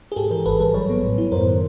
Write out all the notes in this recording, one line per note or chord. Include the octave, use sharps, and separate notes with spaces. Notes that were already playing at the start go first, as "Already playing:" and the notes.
G#4
G#2 G4 A4
E3 G#4 A#4
A1 A4 B4
G3 A4 B4
F#3 B4 C#5
B3
A2
E4
F#2 A#4 C5
D#3